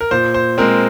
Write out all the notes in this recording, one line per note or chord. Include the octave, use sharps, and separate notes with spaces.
A#4
A#2 C5
C5
G#3 C4 A#4